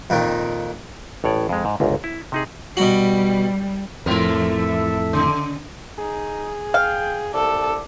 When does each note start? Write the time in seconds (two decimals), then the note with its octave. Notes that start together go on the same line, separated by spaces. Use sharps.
0.10 F2 A#2 D#3
1.24 A1 A2 C#5 D5
1.49 F2 G#3
1.65 G#2
1.80 G1 C#2 G#2
2.04 E4
2.32 C3 D#4 G#4
2.77 B2 G3 F#4
4.06 F2 A2 E3 A3 A4 A#4 E5
5.13 C#3
5.98 D#4 G#4
6.74 F5 G5
7.34 C2 A4 D5